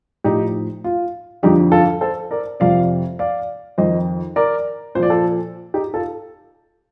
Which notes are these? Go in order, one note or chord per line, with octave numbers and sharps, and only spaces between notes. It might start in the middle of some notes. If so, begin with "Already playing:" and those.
A2 F3 D#4 G4
F4
F2 D3 F3 D#4 G4
F4 A4
A4 C5
A#4 D5
F2 C3 F3 D5 F5
D5 F5
F2 D#3 C5 D#5
A#4 D5
A#2 F3 C5 D5
A4 C5
D#4 G4
F4 A4